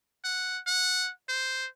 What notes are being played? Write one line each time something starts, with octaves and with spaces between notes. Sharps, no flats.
F#5
F#5
C5